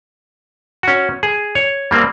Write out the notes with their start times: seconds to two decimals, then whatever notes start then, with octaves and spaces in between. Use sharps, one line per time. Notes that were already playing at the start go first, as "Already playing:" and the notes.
0.83 C#4 F#4
1.23 G#4
1.55 C#5
1.91 G3 A#3 C4